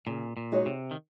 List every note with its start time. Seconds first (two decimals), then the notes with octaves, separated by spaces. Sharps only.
0.06 A#2 C#3
0.37 A#2
0.52 G#3 D#4 F#4 C#5
0.66 C3
0.91 D#3